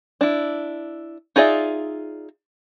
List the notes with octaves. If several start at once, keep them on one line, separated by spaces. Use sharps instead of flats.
D4 E4
D#4 F4 G#4 D5 E5